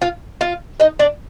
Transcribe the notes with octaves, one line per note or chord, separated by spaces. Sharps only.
F4 F5
F4 F5
D#4 D#5
D4 D5